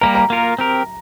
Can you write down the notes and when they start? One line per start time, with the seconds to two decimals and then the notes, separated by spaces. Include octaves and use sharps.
0.01 G3 A#3 G4 A#4 A#5
0.15 A#5
0.30 A#3 F4 A#4
0.59 C4 G4 A#4